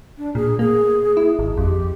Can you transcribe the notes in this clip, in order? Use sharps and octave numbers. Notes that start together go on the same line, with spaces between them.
D4
A#2 G#4
A#3 G#4
E4
G#1
F2 G4